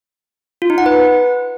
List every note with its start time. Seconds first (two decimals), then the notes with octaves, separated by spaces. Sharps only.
0.62 F4
0.70 D#4
0.78 F#5
0.86 B4